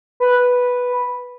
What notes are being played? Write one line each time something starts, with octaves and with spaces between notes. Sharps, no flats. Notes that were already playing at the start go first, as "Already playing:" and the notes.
B4